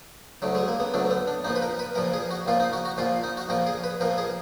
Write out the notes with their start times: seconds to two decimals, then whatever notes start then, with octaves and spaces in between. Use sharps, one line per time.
0.42 D2 D3 F#3
0.55 G#3
0.68 A#3
0.80 B3
0.94 D2 D3 F#3 D4
1.10 B3
1.27 D4
1.44 A#1 A#2 F3 D#4
1.56 B4
1.62 A#4
1.79 B4
1.95 A#1 A#2 F3 A#4
2.14 G#4
2.31 F#4
2.46 A#1 A#2 F3 F4
2.60 D#4
2.73 F#4
2.85 F#4
2.98 A#1 A#2 F3 F4
3.23 D#4
3.37 F#4
3.49 A#1 A#2 F3 A#4
3.67 G#4
3.84 B4
4.00 A#1 A#2 F3 A#4
4.18 G#4